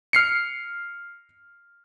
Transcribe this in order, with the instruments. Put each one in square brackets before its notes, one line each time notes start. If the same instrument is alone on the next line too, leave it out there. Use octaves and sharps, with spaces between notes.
[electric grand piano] F6 C7 C#7